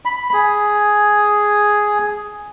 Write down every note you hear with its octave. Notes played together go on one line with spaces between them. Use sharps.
B5
G#4